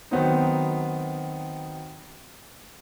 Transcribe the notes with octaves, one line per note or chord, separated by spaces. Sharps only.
D#3 F#3 B3 C4 D#4